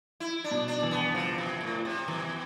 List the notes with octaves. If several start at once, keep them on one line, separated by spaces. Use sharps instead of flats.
E4
D4
B2
D4
E3
B3
C3 F3
B2
A2
C3
B2 E3